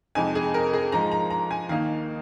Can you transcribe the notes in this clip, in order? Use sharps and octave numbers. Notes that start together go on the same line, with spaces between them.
F2 C3 G#3 D#4 G#5
G#4
A#4
G#4
G#2 F3 G#3 A#5
A#5
A#5
G#5
D#2 D#3 A#3 D#4 F5